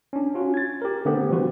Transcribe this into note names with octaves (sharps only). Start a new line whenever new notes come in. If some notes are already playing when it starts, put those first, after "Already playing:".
C#4 D4
C#4 F4 F#4
G#6 A6
G4 A#4
D3 A3 B3 C4 G4
E3 F3 G3 C4 F#4 B4